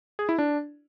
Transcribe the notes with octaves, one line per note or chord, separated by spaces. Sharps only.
G#4
E4
D4